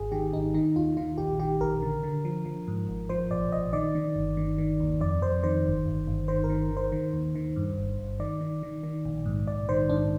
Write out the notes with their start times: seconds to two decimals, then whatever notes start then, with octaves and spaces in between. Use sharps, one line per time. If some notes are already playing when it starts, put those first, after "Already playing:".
Already playing: G#1 G#4
0.12 D#3 G4
0.33 G#1 D#4
0.54 D#3 D#4
0.76 D#2 F4
0.97 D#3 F4
1.18 A#1 G4
1.39 D#3 G4
1.61 A#1 A#4
1.82 D3
2.03 D3
2.25 F3
2.46 F3
2.68 G#2
2.88 G#1
3.09 F3 C5
3.31 A#1 D5
3.52 A#1 D#5
3.73 D#3 D5
3.95 D#3
4.16 G1
4.37 D#3
4.58 D#3
4.80 D#2
5.01 F2 D5
5.22 F2 C5
5.43 D#3 C5
5.65 G1
5.86 G1
6.07 G1
6.28 D#3 C5
6.44 A#4
6.50 D#3
6.71 D#3
6.77 C5
6.92 D#3
7.13 D#2
7.35 D#3
7.56 G2
7.77 G1
7.98 G1
8.20 D#3 D5
8.41 D#3
8.63 D#3
8.83 D#3
9.05 A#1
9.26 G#2
9.47 A#1 D5
9.69 D#3 C5
9.89 G#2 D4